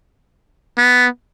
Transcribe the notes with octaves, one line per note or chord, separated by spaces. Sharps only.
B3